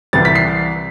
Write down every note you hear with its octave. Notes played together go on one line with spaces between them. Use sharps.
C2 C3 E3 G3 A6
B6
C7